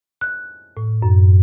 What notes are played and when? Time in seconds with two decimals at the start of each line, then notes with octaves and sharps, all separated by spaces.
0.21 F#6
0.77 A2
1.03 F#2